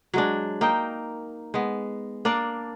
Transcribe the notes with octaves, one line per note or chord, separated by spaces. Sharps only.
F#3 G#3 D4
A#3 D#4 G5
G#3 B3
A#3 D4 D5